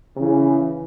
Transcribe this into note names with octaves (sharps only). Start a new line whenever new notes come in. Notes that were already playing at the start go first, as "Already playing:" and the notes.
C#3 E3